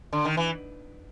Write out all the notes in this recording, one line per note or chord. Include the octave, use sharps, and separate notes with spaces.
D3
D#3
E3